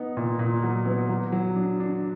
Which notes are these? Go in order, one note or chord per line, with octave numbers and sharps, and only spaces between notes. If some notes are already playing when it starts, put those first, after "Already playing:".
Already playing: B3 D#4
A#2
A#2
F#3
B3
F#3
F#3
D4
D4